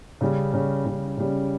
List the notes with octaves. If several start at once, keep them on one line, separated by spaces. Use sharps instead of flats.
C#3 G3 C#4
C#3 G3 C#4
C#3 G3 C#4
C#3 G3 C#4